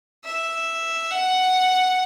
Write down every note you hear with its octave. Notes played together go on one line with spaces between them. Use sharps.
E5
F#5